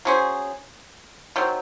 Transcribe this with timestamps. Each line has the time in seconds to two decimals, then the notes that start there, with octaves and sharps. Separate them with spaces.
0.05 F#3 C#4 G#4 C5
1.36 D#3 F#3 C4